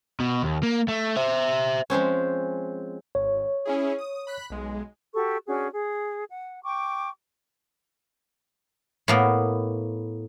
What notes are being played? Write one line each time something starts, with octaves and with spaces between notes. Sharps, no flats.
B2
D#2
A#3
A3
C5 E5
F3 G#3 C4 C#4
G#1 C#5
C#4 E4 G#4
D#6
B5 F#6 B6
B1 G#3
F#4 G4 A4 C#6
C#4 D4 F#4 G#4
G#4
F#5
G5 C#6 D6
A2 A#3 B3